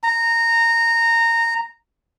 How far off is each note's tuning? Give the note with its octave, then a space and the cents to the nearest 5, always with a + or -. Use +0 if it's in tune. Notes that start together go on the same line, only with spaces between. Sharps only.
A#5 -15